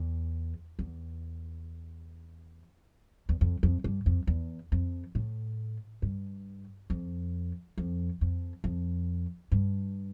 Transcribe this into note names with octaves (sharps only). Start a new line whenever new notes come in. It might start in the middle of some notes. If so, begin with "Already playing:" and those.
Already playing: E2
E2
E2
F2
F2
G2
F2
E2
F2
A2
G2
F2
F2
F2
F2
G2